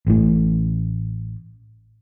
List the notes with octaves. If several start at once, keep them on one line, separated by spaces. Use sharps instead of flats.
A1 A2